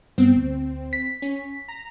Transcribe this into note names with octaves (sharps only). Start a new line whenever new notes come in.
G2 B3 C4
D2
B6
C#4
A#5